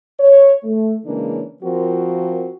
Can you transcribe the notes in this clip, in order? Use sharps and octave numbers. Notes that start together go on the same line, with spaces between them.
C#5
A3
C#3 E3 G#3 A#3 C#4 D4
F3 C4 F4 F#4 A#4